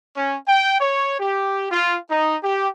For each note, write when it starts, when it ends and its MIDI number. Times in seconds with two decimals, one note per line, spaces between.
0.16 0.36 61
0.48 0.79 79
0.81 1.17 73
1.18 1.70 67
1.71 1.97 65
2.10 2.36 63
2.43 2.67 67